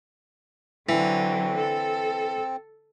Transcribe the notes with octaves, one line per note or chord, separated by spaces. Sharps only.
D3 E3 F#3 C4
A4